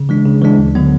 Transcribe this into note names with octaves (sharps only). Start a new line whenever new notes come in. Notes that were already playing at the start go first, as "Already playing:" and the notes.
Already playing: C#3
E3 G#3 D4
C#3
E3 G#3 D4
D2
D3 F#3 B3